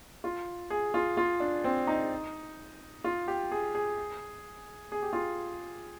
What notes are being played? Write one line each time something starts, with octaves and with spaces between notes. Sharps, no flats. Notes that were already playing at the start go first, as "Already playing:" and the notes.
F4
G#4
F4
F4
D4
C4
D#4
F4
G4
G#4
G#4
G#4
G4
F4